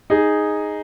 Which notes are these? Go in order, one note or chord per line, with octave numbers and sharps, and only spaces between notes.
D#4 G#4